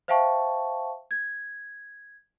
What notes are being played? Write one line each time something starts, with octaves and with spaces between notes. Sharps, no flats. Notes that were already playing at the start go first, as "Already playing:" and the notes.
C5 E5 F5 G5 A5 C#6
G#6